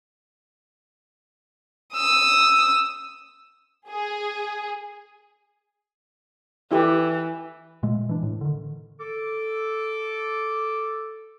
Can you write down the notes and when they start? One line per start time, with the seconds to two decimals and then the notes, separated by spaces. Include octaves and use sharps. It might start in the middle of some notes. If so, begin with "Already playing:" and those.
1.94 D#6 E6
3.89 G#4
6.72 E3 E4 G4 A4
7.83 A#2 G#3 A3
8.09 E3 D4
8.23 A2
8.41 D3 D#3
8.99 A4 D6